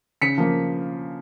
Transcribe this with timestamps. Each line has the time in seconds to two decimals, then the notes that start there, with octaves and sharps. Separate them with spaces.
0.22 C#3 B6 C#7
0.38 F3 A#3